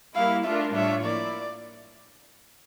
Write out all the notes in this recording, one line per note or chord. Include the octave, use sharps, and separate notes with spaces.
G3 A#3 E4 F5
A3 D4 F4 A#4 E5
A2 G3 D4 F4 C#5 E5
F3 A#3 E4 D5